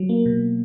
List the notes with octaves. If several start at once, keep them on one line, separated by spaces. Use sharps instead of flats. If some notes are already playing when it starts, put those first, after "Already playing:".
Already playing: F#3
A#3
B2